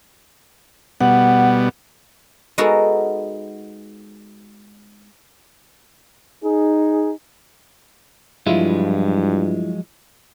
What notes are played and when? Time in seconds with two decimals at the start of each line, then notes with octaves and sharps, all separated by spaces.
1.01 B2 G3 B3 F#5
2.58 G#3 B3 D#4 F#4 A4 A#4
6.44 D#4 G#4
8.47 G2 F3 F#3 G#3 E4 F4